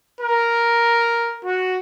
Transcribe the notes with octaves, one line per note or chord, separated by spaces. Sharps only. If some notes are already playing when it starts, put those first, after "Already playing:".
A#4
F#4